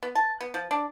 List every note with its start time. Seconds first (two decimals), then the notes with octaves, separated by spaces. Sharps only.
0.03 B3
0.15 A5
0.41 B3
0.54 F3
0.71 D4